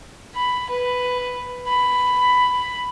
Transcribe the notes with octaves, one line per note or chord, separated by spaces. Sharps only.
B5
B4
B5